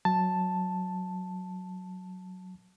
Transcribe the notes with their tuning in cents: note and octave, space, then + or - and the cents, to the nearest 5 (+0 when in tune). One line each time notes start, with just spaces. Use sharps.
F#3 +0 A5 +0